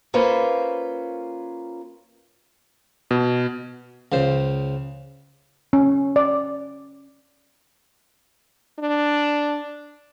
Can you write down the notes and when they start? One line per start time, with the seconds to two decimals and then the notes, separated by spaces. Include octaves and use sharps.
0.14 A#3 C#4 F4 B4 C5
3.11 B2
4.12 C#2 C#3 C5
5.73 C#4
6.16 D5
8.79 D4